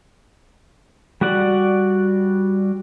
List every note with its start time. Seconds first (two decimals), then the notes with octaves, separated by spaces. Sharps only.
1.21 G3 F#4 D5 F#5